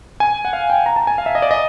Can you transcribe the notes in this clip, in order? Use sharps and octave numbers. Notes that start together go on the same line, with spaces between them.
G#5
F#5
F5
G5
A#5
A5
G#5
F5
E5
D#5
D5
D#5